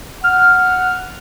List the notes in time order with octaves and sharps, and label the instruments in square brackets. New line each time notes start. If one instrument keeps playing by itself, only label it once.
[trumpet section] F#5 [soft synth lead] F6